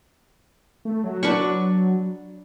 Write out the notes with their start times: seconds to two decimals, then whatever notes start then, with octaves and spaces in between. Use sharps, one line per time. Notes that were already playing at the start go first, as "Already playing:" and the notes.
0.85 A3
1.04 F#3
1.23 D4 B4 C#6